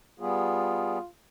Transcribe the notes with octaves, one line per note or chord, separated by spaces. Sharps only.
G3 B3 F4 G#4